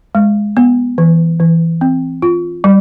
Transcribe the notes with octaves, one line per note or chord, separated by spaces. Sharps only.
G#3
B3
E3
E3
C4
F4
G3